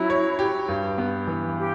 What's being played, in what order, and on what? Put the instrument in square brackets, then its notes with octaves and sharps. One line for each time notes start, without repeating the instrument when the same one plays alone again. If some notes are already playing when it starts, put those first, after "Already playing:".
Already playing: [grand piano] F#3 C#4 [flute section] E4
[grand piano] C#5
G4
G2
B3
E3
[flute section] G4